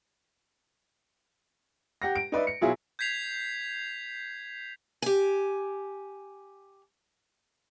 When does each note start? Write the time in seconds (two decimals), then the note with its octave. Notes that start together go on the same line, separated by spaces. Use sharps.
2.02 G4 F#5 A#6
2.16 D7
2.32 D#4 B4 D5 E5
2.47 C#7
2.61 B2 F#3 E4 F4 G#4
2.99 G6 G#6 B6 C7 F7
5.02 G4 G#5